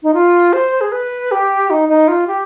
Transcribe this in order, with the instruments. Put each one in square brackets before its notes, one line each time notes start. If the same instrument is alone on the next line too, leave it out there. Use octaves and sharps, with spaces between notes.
[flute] D#4
F4
C5
G#4
B4
G4
D#4
D#4
F4
G4